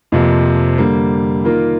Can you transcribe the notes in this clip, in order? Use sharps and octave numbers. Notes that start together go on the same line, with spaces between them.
F2 C3 F3 A#3
D3 G3 A#3
D#3 A#3 F4 A#4